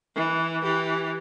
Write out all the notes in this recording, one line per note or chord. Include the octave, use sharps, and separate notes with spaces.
E3
E3 G4